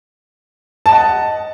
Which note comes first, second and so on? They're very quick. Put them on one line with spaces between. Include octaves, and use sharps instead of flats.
A5 D#5 F#5